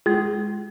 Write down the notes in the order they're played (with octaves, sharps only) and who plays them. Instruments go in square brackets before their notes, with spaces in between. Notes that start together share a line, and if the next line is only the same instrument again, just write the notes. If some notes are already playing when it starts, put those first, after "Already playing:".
[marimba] G#3 [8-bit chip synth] F4 G#4